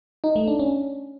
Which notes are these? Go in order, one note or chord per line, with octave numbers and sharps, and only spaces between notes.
D#4
A3
D4
C#4